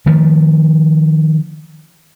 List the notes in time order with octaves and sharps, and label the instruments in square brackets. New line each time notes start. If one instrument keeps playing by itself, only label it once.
[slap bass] D#3 F3 A3